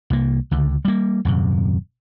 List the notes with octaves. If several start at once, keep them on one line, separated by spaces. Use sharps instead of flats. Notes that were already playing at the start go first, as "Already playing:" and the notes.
C2 A#3
C#2 D3
G3 A#3
D#1 F#2 C3